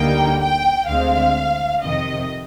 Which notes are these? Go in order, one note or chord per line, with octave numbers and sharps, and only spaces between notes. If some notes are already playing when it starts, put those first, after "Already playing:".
Already playing: D2 D3 G3 A#3 D#4 G5
G5
D2 D3 G#3 C4 F5
F2 C3 D#3 D#5